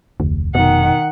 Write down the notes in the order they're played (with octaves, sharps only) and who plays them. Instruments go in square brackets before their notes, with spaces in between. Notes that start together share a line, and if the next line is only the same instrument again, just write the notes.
[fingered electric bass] F1 [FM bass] D2
[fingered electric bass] F1 [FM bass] B2 [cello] D#3 F#5